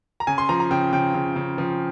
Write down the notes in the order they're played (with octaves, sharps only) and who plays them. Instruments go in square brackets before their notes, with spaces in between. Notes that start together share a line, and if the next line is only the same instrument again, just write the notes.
[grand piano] A#5
C#3 G#5
C6
F3 A#5
A#5
C#3 G5
C#3 G5
C#3
C#3
F3